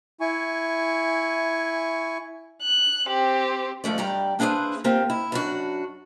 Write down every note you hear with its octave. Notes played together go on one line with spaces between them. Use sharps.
E4 G#5 C#6
F#6
C4 G4
G#2 F3 A3 D5
G2 G3 D5 A#5
A#3 D4 E4 G#4 B4 C5
A#3 C4 F4 G4
E4
F#2 D4 F#4